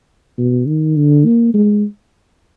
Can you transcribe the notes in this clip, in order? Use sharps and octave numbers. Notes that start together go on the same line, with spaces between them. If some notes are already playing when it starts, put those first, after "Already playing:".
B2
D#3
D3
A#3
G#3